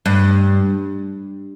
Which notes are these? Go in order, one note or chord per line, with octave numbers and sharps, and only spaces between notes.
G2